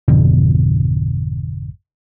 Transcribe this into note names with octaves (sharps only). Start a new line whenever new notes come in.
G#1 F2 B2 D3